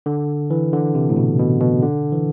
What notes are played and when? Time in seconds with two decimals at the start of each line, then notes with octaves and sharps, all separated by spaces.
0.06 D3
0.50 E3
0.73 D3
0.95 C3
1.10 A2
1.16 B2
1.39 B2
1.61 B2
1.82 D3
2.12 E3